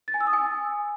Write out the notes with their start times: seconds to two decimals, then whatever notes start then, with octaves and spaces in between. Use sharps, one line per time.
0.08 A6
0.14 G#5
0.21 E6
0.27 D#6
0.33 G#5